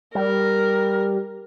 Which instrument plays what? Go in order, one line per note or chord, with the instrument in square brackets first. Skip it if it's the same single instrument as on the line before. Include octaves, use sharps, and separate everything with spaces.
[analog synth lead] G3 [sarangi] A#4